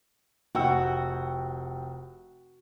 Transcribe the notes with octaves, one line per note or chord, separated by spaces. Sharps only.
F1 F#4 G5 E6